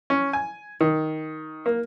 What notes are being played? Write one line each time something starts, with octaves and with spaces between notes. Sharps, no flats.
C#4
G#5
D#3
A#3